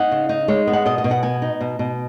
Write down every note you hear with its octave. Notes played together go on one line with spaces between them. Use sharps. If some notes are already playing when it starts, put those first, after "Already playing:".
Already playing: D#4 F#5
C#3
D#4
G#3 C#5
B3
F#5
B2 D#5
D#5
B2
F#5
B3 G#5
D#4
B2
B2